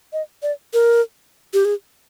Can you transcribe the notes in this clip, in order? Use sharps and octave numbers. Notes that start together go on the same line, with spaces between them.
D#5
D5
A#4
G4
G#4